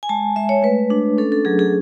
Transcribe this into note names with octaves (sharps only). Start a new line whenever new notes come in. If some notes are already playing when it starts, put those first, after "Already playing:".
G#5
G#3 A5
G#3 E5
C#5
A3 B4
D4
C#4 A4
A4
F#3 G#4
G#4